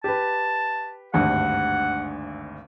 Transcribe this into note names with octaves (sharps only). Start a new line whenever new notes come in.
G4 B4 A5
G#1 D2 G2 F#5